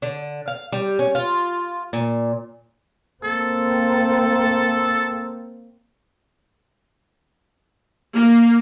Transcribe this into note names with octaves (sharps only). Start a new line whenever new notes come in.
D3
F5
G3
C#4
F4
A#2
A#3 C4 A4
A#3